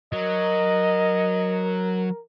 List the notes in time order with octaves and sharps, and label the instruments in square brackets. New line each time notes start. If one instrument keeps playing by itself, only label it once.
[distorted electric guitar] F#3 [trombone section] A#4 [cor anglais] D#5